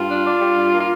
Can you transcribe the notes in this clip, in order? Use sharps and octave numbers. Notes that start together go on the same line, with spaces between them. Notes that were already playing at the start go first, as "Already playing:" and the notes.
Already playing: G2 F4
D4
D4
G3
G2
A#3
F4